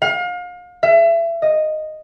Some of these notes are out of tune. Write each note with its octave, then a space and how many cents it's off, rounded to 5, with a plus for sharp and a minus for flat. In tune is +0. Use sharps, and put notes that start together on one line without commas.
F5 +35
E5 +30
D#5 -5